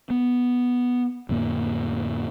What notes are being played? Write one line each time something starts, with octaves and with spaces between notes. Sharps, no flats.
B3
F2 A2 D3 A#3